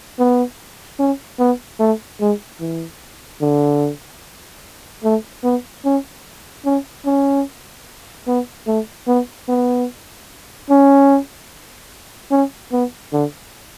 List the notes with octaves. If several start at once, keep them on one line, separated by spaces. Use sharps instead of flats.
B3
C#4
B3
A3
G#3
E3
D3
A3
B3
C#4
C#4
C#4
B3
A3
B3
B3
C#4
C#4
B3
D3